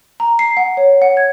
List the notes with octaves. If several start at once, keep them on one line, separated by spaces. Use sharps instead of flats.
A#5
C7
F#5
C#5
F#5
G#6